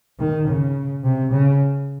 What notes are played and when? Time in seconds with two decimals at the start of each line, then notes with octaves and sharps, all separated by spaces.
0.19 D#3
0.48 C#3
1.03 C3
1.32 C#3